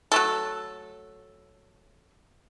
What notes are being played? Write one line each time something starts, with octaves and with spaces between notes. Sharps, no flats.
F#3 A3 A4